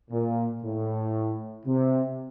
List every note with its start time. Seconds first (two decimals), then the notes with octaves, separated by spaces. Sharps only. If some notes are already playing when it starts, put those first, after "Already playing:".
0.11 A#2
0.63 A2
1.65 C3